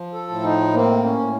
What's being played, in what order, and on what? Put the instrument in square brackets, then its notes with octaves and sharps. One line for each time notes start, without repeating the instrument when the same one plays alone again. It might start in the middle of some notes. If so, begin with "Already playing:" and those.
Already playing: [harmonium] F3
A4
A2
D#4
A#3 C4
C#4
A2